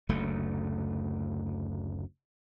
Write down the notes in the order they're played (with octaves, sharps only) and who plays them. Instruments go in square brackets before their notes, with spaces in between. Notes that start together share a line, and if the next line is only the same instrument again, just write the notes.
[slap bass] F#1 D2 A3